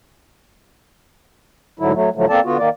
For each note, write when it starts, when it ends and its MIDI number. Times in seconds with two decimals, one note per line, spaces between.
1.79 1.92 38
1.79 1.92 44
1.79 1.92 50
1.79 1.92 54
1.79 1.92 64
1.94 2.09 54
1.94 2.09 57
2.15 2.26 45
2.15 2.26 50
2.15 2.26 53
2.15 2.26 54
2.15 2.26 57
2.29 2.40 58
2.29 2.40 60
2.29 2.40 69
2.29 2.40 74
2.29 2.40 81
2.45 2.57 50
2.45 2.57 59
2.45 2.57 65
2.45 2.57 66
2.58 2.69 51
2.58 2.69 58
2.58 2.69 74